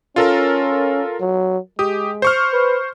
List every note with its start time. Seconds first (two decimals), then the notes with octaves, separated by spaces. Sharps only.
0.16 C#4 F4 A4 A#4
1.21 F#3
1.79 G#3 G4 D#6
2.22 C5 C#6 F6
2.53 B4